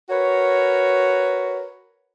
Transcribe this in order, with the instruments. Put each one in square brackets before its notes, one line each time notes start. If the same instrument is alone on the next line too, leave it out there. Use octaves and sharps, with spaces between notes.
[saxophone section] F#4 A#4 B4 C#5